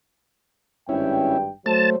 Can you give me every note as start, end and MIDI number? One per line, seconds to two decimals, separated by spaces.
0.89 1.49 32
0.89 1.50 43
0.89 1.37 61
0.89 1.37 64
0.89 1.49 79
1.66 1.97 54
1.66 1.96 57
1.66 1.96 72
1.66 1.90 81